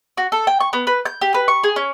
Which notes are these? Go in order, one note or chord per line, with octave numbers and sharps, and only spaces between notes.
F#4
A4
G5
C#6
B3
B4
G6
G4
B4
C#6
G#4
C#4